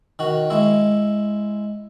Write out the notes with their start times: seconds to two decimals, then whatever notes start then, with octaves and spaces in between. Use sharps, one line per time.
0.19 D#3 F#4
0.50 G#3 E4